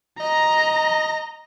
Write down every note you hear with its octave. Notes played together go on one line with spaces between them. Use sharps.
D#5 A#5